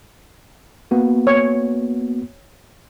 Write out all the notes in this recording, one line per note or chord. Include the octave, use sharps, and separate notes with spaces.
A#3 B3 F#4
C#5